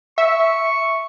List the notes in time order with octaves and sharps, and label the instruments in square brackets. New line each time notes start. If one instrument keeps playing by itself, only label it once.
[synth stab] E5 [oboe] C#6